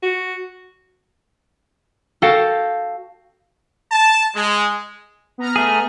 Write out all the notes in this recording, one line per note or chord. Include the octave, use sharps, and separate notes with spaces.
F#4
F#4 A4 F5 G5 A5
A5
G#3
B3 A#5 F6
A3 G#4